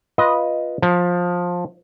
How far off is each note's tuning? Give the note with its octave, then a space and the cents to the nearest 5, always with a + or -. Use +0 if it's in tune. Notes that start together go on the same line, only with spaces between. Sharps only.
F4 +0 B4 -10 D#5 +0
F3 +15 A#5 +35